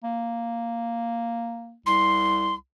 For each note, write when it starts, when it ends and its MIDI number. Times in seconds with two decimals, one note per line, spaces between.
0.04 1.76 58
1.86 2.54 36
1.86 2.54 84